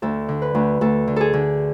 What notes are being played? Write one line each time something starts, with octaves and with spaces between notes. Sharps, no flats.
D2 A4
D3
B4
D2
D2 A4
D3
G#4 A4
D3